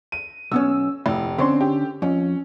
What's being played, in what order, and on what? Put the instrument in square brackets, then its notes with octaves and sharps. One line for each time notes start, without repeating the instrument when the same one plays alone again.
[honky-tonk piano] D#7
[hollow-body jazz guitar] B1 B3 C#4 [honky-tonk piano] E6
[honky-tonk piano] F1 [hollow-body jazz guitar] A2
[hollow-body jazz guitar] D3 C#4 C6 [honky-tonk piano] C4
[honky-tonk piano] G4
[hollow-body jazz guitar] F2 [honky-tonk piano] C#4